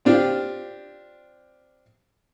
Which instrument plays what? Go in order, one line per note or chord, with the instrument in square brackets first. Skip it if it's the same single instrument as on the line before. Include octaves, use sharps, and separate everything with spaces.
[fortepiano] C4 D4 F4 G4